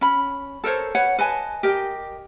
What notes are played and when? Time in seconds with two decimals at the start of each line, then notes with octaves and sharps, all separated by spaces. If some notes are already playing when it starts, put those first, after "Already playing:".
0.01 C#4 B5
0.64 A4 A#4 C5 C#5
0.95 B4 C#5 F#5
1.19 B4 D#5 G#5 A5
1.63 G4 A#4 D#5